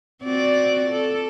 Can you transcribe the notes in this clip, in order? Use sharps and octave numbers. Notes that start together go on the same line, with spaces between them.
C4 F#4 D5
A4